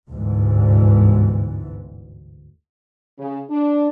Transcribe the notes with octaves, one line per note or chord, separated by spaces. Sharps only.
G1 D2 G#2 C3 E3
C#3
D4